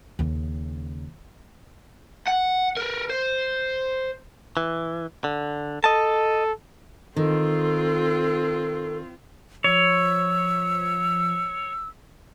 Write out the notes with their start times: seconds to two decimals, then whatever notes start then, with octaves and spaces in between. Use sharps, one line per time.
0.19 D#2 C#3
2.28 F#5
2.77 A#4 B4
3.09 C5
4.57 E3
5.24 D3
5.84 A4 D#5 A5
7.16 D#3 C4 F4 A4
9.64 F3 C#5 E6